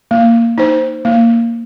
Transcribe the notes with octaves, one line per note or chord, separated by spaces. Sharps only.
A#3
D#4 C5
A#3